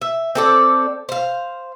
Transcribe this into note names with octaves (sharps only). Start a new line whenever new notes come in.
E5
C4 A4 D5
C5 F5